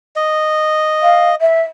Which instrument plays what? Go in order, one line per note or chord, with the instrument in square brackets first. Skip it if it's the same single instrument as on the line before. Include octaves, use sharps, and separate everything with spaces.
[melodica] D#5
[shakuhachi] F5
E5